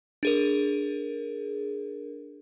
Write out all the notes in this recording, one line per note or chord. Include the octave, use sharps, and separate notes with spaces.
D4 G#4 A#4